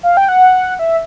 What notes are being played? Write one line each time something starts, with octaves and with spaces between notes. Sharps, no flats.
F5
G5
F#5
E5